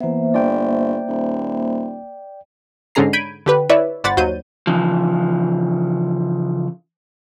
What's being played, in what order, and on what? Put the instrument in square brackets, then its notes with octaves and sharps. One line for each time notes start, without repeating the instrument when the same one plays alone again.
[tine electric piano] E3 B3 [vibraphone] A#3 C5 E5
[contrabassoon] G1 [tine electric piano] D5 G5
[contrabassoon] D#1
[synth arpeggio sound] G#2 D3 C#4 G#4 A#5 C7
B5 G6 G#6 D7 D#7
D3 G4 B4
E4 B4 C#5 D5 E5
G1 C5 D5 F#5 B5 A6
D#2 F#3 C5 G6 D#7
[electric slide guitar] C#3 E3 F3